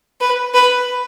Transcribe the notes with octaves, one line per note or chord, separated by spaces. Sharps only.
B4
B4